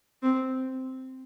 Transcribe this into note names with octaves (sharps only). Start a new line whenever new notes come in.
C4